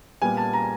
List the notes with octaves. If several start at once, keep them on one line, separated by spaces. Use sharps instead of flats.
A#2 G3 B3 G#5
A5
A#5